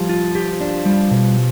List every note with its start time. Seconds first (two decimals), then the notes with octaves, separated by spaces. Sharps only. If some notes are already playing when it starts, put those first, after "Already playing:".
Already playing: F3 G3
0.09 F4
0.35 G4
0.61 D4
0.86 G3
1.11 B2